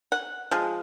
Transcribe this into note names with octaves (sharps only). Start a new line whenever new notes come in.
F#5
F3 G#3